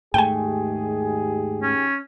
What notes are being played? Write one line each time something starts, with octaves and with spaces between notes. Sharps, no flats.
D#2 G#2 A3 G4 G#4 G5 G#5
C#4